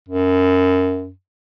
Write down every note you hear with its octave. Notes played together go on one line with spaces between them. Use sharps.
F#2